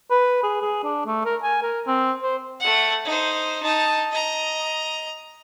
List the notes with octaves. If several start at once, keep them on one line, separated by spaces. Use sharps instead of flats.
B4
G#4
G#4
D4
A3
A#4
G#5
A#4
C4
C5
A3 F#5
D#4 C5
D#4 A5
D#5 A#5